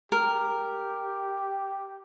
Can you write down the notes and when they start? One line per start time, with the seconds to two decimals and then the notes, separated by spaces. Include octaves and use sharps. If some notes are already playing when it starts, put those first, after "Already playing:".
0.12 G4 A#4